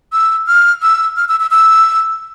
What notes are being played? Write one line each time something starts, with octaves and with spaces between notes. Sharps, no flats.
E6
F6
E6
F6
E6
E6
E6